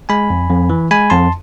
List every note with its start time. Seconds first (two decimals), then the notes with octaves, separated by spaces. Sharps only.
0.09 G#3 G#5 B5
0.30 F2
0.50 F2
0.70 E3
0.91 G#3 G#5 B5
1.10 F2 A5 C6